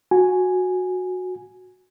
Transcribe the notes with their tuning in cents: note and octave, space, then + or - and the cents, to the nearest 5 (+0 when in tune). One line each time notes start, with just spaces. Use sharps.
F#4 -15 G#5 +0